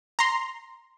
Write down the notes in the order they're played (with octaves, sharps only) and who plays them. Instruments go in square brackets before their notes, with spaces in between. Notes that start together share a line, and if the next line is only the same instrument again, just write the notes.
[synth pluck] A#5 C6